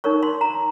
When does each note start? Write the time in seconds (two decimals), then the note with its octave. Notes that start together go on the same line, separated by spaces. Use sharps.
0.04 D#4 A#4 C#5 C#6
0.23 C6
0.41 A#5